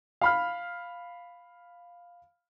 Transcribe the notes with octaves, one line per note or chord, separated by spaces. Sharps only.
F5 B5 F6